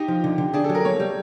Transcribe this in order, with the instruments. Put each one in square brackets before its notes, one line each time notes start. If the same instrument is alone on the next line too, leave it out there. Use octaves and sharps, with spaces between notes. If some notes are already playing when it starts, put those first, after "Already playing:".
Already playing: [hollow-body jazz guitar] D#4 [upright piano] G4
[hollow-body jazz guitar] F3
D3
D3
[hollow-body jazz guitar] D4 [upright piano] G#4
[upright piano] A4
[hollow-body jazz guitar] F#3
[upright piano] A#4
[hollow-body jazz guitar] A#3 [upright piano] C#5
[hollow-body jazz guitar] G3